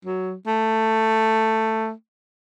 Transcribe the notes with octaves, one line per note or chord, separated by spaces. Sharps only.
F#3
A3